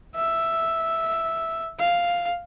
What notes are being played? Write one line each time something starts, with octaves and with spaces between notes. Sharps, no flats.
E5
F5